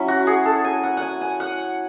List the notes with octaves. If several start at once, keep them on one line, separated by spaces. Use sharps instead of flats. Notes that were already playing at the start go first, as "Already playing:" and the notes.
Already playing: F#3 C#4 E4
F#4
G#4
A4
G#5
F#5
F#5 G#5
G#5
F#5